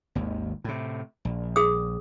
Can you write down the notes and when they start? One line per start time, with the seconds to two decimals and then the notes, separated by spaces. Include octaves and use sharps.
0.15 G#1 D#2
0.64 A2 C3
1.25 A#1
1.56 G#4 D#6